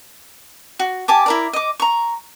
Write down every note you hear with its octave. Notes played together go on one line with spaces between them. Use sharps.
F#4
G4 G#5 A5 D6
E4 A#4 D5
D#5 D6
A#5 C#6